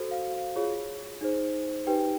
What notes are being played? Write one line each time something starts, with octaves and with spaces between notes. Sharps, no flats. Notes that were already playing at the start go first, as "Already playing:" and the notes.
Already playing: F#4 A4 C5
F5
F5
F4 G#4 C#5
D#4 G#4 C5
D#4 G4 B4 G5